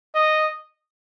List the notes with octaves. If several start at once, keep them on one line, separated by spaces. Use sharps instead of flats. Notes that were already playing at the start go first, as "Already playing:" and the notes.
D#5